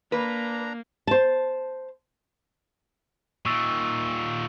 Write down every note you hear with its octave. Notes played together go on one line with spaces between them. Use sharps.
A#3 D4 B4 A#5
C5 A5
A#2 D#3 C#6 E6 A6